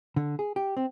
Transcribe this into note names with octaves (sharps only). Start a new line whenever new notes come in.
D3
G#4
G4
C4